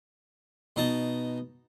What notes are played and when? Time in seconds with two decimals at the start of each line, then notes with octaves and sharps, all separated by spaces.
0.76 B2 D#4 A5